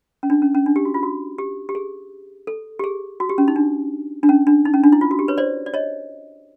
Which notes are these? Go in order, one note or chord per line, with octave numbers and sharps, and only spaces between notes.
C#4
D4
C#4
C#4
D4
G4
F#4
F4
F#4
G4
G4
G#4
A4
G4
G#4
F#4
G4
C#4
D#4
D4
D4
C#4
D4
D#4
C#4
D4
E4
F4
F#4
G4
B4 C#5
C5 D5
D5
C#5 D#5